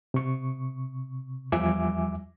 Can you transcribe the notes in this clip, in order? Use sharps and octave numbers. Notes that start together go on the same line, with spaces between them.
C3 C#6
E2 F3 G3 E5 G#5 D6